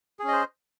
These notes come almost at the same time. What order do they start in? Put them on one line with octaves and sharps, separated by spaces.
G#4 C#4 D#5 C5